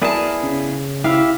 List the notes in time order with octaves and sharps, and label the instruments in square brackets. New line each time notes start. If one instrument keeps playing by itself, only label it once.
[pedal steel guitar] B3 E4 G#4 [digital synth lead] A#4 [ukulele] D5 A5
[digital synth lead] C#3
[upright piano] E4 [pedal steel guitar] G4 E5 [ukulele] F5